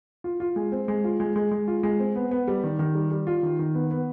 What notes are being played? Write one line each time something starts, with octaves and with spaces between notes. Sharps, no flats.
F4
F4
G#3
C4
G#3
F4
G#3
G#3
G#3
F4
G#3
C4
B3
B3
G3
D#3
D#3
G3
G3
F4
D#3
D#3
B3
B3